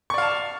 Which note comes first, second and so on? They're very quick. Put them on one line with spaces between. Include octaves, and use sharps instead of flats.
C#6 D5 F5 A5